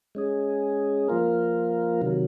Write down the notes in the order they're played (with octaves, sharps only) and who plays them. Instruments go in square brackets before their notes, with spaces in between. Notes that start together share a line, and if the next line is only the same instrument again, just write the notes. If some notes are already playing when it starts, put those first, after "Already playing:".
[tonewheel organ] G#3 C#4 G#4
F3 A#3 F4 A#4
C3 D#3 F#3